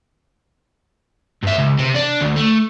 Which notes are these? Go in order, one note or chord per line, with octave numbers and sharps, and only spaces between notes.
G2 E5
C#2
C3
D4
D2
A3